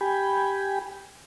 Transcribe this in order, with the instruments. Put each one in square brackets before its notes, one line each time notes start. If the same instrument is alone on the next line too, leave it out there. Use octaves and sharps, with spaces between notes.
[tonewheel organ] G4 G5 G#5 B5